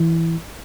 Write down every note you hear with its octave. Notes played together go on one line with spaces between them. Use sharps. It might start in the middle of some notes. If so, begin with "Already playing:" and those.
Already playing: E3